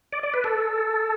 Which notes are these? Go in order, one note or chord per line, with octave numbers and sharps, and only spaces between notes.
D5
D5
B4
A4